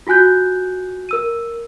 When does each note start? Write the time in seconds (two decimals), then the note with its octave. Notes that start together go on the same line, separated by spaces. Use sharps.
0.07 F4 F#4 G#5 F#6 G6
1.09 A#4 E6 D#7